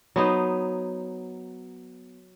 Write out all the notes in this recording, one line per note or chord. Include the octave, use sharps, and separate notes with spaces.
F#3 B3 D#4 C5